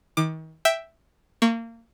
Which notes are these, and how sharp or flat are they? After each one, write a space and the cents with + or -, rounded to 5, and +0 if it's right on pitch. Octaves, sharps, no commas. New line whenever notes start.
D#3 +40 D6 +25
E5 +0 G5 +0
A#3 -25 C#6 +0